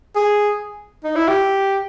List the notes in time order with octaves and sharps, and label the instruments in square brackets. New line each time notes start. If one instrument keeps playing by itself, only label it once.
[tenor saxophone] G#4
D#4
E4
G4